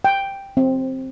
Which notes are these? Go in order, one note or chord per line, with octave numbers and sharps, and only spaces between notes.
G5
C4